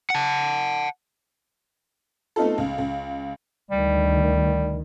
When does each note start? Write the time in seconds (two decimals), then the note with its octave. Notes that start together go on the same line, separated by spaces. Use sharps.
0.10 F#5 A5
2.36 A3 B3 C4 D#4 F4 A4
2.58 C#2
2.78 C#2
3.71 D2 D#3 G3